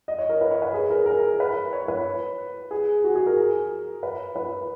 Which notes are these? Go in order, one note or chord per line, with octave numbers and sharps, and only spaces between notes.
D#5
C#5
A#4
B4
C#5
B4
G#4
A#4
A#4
B4
C#5
B4
G#4
F#4
G#4
A#4
B4
B4